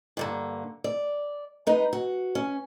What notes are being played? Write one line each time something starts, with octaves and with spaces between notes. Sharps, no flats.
G2 D3 A#3
D5
G#3 D#4 B4
F#4
C#4